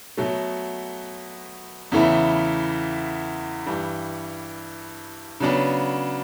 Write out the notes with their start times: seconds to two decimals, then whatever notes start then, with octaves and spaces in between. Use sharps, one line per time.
0.17 B2 F#3 A3
1.92 E2 C#3 E3 A3 E4
3.66 G2 E3 G3
5.40 C#3 F#3 B3 D4